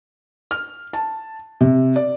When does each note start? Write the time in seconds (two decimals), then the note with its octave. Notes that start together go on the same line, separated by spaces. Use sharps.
0.51 F6
0.93 A5
1.61 C3
1.96 D5